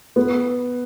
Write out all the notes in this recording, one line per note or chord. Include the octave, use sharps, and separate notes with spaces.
B3